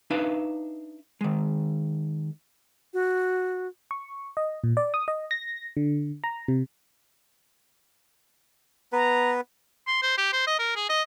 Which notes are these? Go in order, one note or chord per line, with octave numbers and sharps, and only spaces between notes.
D4 D#4 B4 E5 F5
D#3 G#3
F#4
C#6
D#5
A#2
D5
D#6
D#5
A#6
D3
A#5
C3
B3 B4 A#5
C6
C5
G4
C5
D#5
A#4
G#4
D#5